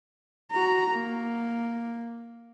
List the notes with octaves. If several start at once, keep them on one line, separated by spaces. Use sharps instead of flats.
F#4 A#5
A#3